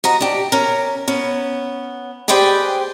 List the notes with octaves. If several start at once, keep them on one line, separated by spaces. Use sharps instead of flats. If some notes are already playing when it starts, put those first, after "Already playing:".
F#4 D#5 A#5
D4 G4
C#4 A#4
B3 C#4
G4 G#4 B4 C5 D5 G5